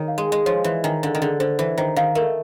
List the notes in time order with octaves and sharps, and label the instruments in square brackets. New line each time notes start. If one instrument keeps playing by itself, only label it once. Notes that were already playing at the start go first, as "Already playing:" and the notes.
Already playing: [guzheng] D#3 [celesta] C#5
[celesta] F5
[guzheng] G#3
[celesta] G#5
[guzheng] G#3
[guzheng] F3 [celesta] C#5
[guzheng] E3 [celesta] C#5
[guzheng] D#3 [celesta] G#5
[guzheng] D3 [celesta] F5
[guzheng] D#3
[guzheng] D3 [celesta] G#4
[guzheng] D3 [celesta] C5
[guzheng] E3 [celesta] C5
[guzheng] D#3 [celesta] C5
[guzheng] D#3 [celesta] F5
[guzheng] A3 [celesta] A#4